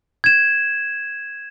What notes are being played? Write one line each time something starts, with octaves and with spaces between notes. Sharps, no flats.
G#6 E7